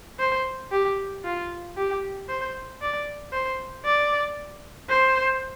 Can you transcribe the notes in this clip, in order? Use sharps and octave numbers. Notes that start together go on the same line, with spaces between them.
C5
G4
F4
G4
C5
D5
C5
D5
C5